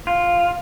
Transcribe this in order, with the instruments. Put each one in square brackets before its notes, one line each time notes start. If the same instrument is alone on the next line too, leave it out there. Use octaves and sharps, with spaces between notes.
[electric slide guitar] F4